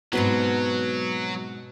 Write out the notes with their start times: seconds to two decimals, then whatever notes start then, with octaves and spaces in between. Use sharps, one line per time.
0.13 G#2 B2 F#3 C4 B4 C6